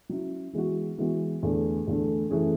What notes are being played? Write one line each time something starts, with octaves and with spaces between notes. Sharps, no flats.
F#3 C#4 E4
E3 G#3 B3 F#4
E3 G#3 B3 F#4
E2 D3 A3
E2 D3 A3
F#2 E3 A3 C#4 G#4